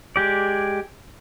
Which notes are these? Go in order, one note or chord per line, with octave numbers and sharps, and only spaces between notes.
G#3 G4 D5